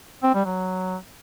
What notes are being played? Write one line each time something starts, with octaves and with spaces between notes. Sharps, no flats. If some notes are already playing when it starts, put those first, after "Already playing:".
C4
G3
F#3